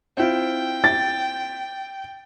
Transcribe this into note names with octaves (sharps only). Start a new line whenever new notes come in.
C4 E4 F4 G5
A6